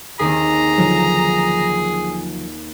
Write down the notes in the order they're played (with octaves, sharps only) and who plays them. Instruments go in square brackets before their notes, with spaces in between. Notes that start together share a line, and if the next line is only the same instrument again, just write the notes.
[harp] D#2 D#3 C4 [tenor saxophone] G#4 [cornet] A#5
[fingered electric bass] D3 F3 F#3